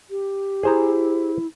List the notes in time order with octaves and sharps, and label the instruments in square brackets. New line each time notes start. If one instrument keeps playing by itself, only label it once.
[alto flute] G4
[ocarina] E4 [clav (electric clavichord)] G#4 C5 A#5